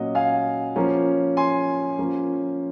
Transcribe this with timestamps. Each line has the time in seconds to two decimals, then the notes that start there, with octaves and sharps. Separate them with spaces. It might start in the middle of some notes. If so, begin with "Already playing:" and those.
Already playing: A#2 F#3 C#4 D#5 F#5
0.15 F5 G#5
0.76 F3 A#3 C#4
1.37 G#5 C6
1.99 F3 A#3 C#4